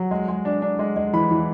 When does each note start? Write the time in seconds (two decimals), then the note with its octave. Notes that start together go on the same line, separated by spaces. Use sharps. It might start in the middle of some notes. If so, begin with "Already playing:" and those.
Already playing: F#3
0.11 G#3
0.28 G#3
0.45 D4
0.62 D4
0.79 G#3
0.96 G#3
1.13 E3 B5
1.31 E3